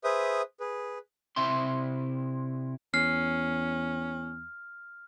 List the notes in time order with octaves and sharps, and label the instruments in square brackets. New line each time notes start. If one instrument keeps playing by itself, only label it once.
[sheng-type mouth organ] G#4 B4 C5 E5 D#6
G#4 B4
[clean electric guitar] C3 E4 E5 G5 C6
[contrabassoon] E2 [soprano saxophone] C#4 [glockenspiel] F6 [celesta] C7